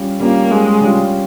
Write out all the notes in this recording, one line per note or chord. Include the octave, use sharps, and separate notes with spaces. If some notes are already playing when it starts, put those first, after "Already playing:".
Already playing: G3 C#4 F4
G3 A#3 C#4 F4
G#3
G3 C#4 F4